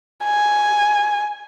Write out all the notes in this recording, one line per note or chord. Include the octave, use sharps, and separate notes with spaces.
G#5